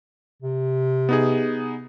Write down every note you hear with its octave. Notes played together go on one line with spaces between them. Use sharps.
C3
B3 D#4 G#4